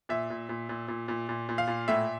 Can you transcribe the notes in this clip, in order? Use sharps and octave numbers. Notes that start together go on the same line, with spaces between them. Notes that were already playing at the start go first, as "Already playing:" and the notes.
A#2 E5
A#2
A#2
A#2
A#2
A#2
A#2
A#2
F5
A#2
A2 E5